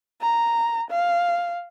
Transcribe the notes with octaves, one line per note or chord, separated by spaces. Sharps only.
A#5
F5